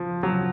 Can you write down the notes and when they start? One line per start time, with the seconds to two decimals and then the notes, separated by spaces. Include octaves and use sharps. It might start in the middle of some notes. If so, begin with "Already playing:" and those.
Already playing: F3
0.23 F#3